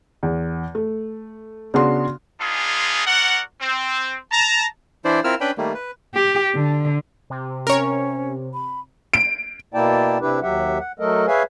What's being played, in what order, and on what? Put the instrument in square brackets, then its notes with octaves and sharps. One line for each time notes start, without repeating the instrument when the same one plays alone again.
[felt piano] E2
A3
C#3 B3 D4 F#4 C6
[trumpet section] G#3 B3 D4 D#4 F4 G#4
F#4 A#4 D5 F#5
C4
A5 A#5
[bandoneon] E3 D4 E4 C5 D5
C4 E4 F4 A#4 E6 F6
C#4 D4 B4 G5 B5
D#3 G3 A3 A#3
B4
[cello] G4
D3
[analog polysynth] C3
[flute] C#4 [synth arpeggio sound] A#4 C#5
[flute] B5
[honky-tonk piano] D7
[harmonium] B2 A#3 E4 D5 G5 A5
C3 D4 E4 G4 B4
D#2 F#3 G4 E5 F#5
F#5
F#3 A3 A4 A#4 D#5
G#4 B4 C#5 E5 F5 G#5